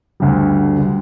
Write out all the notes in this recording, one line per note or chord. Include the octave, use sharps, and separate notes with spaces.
D2 D3 G3
D3 G3